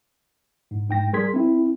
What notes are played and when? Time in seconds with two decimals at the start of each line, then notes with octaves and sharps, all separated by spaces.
0.71 G#2
0.89 G#2 G5 A#6
1.13 G3 G#4 A#4 C6 G#6 B6
1.34 C4 E4